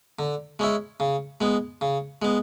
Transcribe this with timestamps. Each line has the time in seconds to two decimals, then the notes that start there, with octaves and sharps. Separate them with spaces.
0.19 D3
0.59 G#3 C#4 E4
1.00 C#3
1.41 G#3 B3
1.81 C#3
2.22 G#3 B3